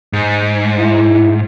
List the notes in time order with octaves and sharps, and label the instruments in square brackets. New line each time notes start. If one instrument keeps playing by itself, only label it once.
[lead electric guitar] G#2
[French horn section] E4